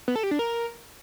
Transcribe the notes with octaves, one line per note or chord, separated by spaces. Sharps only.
B3
A4
G4
D4
A#4